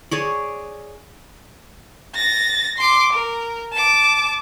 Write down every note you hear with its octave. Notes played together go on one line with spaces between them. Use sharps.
G#4 C#5 D5
A6 A#6
C6 D6
A#4
A5 D6